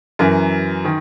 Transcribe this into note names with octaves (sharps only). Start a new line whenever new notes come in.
F#2 E3 A#4
D#3